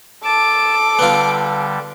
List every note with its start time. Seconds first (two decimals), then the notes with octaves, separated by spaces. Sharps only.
0.25 A4 A5 D6
0.99 D3 G3 B3 F4